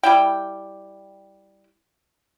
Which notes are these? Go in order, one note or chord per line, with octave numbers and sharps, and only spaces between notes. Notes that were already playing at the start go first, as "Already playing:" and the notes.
G3 E4 G5